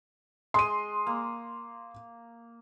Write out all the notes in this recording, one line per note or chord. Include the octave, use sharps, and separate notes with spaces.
G#3 C6 D#7
A#3